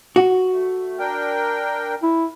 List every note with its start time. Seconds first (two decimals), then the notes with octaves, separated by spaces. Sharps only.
0.16 F#4
0.52 A3
0.99 D4 A#4 G5
2.03 E4